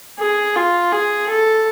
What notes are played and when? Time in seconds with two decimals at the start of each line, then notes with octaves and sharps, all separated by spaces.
0.19 G#4
0.56 F4
0.92 G#4
1.29 A4